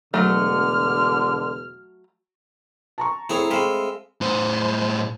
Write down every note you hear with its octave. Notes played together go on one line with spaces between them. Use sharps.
E1 D3 F#3 A3 F6
A5 A#5 C#6
A3 C4 E4 G#4 C#5
G#3 C4 E5 F5 B5
A2 C5